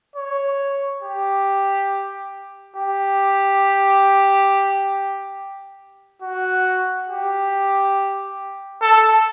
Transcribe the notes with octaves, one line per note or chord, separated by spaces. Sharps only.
C#5
G4
G4
F#4
G4
A4